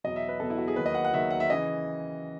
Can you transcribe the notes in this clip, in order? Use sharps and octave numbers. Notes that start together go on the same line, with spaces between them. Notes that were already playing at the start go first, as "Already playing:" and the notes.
E2 B2 F#3 D#5
E5
B4
E2 B2 F#3 A4
E4
F#4
G#4
D#2 D#3 F#3 B4
D#5
F#5
F#5
D#2 D#3 F#3 E5
F#5
E5
C#3 E3 D#5